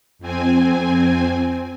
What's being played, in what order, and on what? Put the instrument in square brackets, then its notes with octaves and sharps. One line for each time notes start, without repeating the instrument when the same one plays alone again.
[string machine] F2 C4 G#5